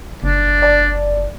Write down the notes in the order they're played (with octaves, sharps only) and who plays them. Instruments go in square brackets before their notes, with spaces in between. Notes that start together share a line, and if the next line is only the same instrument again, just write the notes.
[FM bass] F#1 [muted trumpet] D4
[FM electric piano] D5 A5